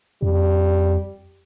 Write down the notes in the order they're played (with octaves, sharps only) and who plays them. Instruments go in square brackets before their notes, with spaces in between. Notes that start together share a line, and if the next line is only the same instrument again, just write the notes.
[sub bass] F2 [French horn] G3